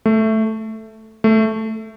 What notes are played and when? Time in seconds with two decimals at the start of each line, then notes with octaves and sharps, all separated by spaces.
0.06 A3
1.24 A3